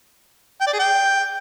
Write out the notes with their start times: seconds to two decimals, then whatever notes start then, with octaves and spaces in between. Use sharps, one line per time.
0.61 G5
0.67 D5
0.73 G#4
0.79 G5